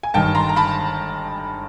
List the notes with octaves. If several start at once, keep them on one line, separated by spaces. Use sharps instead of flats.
G#5
G1 G2 D#3 G5 A5
A#5 C6
A#5
A5 B5